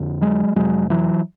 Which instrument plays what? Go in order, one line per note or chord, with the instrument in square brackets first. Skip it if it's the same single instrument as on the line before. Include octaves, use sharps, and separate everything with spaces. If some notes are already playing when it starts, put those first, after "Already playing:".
Already playing: [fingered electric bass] F2 D3
F#3 G#3
F2 C3 F#3 G#3
E3 F#3